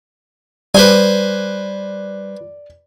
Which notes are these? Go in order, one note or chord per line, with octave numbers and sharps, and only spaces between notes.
G3 B4 C5 D5 G#5